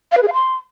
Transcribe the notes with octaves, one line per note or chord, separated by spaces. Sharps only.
F5
B4
G#4
F5
C6